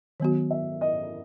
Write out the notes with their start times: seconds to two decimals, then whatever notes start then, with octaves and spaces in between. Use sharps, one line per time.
0.20 D#3 F#3 B3 F#4
0.51 E5
0.81 D#5